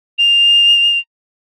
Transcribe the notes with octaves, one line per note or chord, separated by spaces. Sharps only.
F7